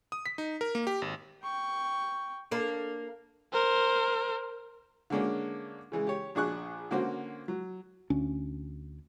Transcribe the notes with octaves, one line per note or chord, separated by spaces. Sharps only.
D#6
B6
D#4
A#4
A#3
G4
G#1
G5 C#6
A#3 D4
A#4 C5
D3 G#3 A#3 C#4 D4
C#3 E3 G#3
G4 C#5
A#1 D4 G#4 C#6 F#6
D3 A#3 C#4 F#4 C5
F#3
D2 C#4 D4